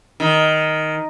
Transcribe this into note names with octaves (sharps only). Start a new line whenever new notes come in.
D#3